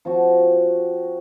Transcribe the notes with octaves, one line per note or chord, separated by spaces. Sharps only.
F3 C4 F#4